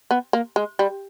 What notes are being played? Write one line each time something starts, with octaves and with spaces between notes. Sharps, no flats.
B3
A#3
G#3
G3